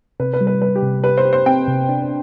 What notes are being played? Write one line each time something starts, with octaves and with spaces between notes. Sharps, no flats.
C3 B4
B4
G3
B4
G3 B4
G4
C3
G4 B4
C5
G4
C5
C4 G5
C3
D4